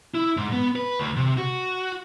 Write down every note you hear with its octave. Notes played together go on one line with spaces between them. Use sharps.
E4
G#2
B3
B4
D2
C3
F#4